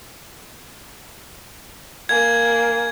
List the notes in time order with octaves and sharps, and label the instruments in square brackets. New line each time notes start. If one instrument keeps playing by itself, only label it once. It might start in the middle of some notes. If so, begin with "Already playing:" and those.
[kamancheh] A#3 G#5 [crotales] G#6